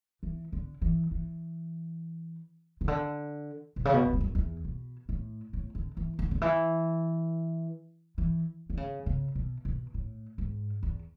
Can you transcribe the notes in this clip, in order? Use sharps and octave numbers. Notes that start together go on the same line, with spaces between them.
E3
D3
E3
E3
C#3
D3
B2
C#3
B2
F#2
G#2
F#2
E2
B2
A2
A2
D3
E3
D3
D3
E3
E3
D3
C#3
C#3
B2
B2
A2
G#2
E2